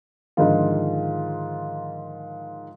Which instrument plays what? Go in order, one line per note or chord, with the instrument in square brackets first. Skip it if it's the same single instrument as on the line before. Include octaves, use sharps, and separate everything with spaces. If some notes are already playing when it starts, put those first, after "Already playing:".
[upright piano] G#2 D3 D#3 F3 F4